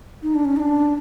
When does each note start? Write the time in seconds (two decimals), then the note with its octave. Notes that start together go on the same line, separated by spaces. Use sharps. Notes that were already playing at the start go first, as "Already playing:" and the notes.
0.23 D#4
0.35 D4
0.45 C#4
0.57 D#4
0.60 D4